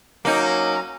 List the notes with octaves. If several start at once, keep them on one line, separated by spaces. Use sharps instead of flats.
F#3 A#3 C#4 D#4 A#5